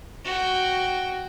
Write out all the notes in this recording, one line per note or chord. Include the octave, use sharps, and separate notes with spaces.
F#4 G5